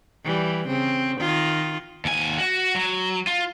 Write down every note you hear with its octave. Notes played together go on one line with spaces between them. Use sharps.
E3 G3
C#3 C4
D#3 F4
D#2 G#5
F#4
F#3
F4